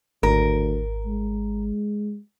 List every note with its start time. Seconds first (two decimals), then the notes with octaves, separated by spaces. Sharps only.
0.23 G#1 D2 A#4
1.07 G#3